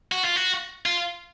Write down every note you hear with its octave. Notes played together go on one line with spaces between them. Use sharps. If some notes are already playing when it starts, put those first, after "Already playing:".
F#4
F4
F#4
F4